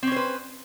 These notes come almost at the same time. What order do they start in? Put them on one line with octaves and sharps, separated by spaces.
C4 C#4 C5 B4